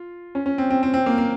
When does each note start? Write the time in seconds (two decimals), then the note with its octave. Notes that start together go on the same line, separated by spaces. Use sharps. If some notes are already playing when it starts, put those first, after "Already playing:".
Already playing: F4
0.35 C#4
0.46 C#4
0.58 C4
0.70 C4
0.83 C4
0.94 C4
1.06 A#3
1.18 A#3